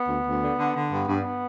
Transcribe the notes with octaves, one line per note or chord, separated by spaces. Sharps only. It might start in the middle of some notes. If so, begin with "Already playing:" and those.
Already playing: B3
D2
D2
D3
D3
D3
G2 B3
G2